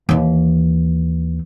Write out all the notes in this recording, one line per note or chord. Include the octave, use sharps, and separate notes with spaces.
D#2 E3